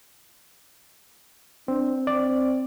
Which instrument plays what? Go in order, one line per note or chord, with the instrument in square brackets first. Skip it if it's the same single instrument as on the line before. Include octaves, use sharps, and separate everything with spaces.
[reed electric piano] C4 [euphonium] D4
[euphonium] C4 [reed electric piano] D5